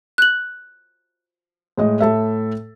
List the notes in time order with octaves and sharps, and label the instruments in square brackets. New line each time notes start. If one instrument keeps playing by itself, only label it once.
[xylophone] F#6 F#7
[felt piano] A2 G#3 D#5
A2 A4 E5